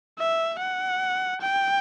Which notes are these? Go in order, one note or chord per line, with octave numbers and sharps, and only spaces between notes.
E5
F#5
G5